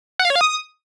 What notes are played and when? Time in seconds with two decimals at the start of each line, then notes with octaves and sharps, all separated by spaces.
0.19 F#5
0.25 F5
0.30 C#5
0.36 F5
0.41 D#6